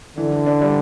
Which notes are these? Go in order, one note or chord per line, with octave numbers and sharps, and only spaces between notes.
D3 E3
E3
D4
G3